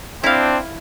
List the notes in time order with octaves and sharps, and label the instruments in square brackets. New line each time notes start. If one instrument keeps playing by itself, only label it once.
[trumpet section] C4 D4 [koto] E4 F5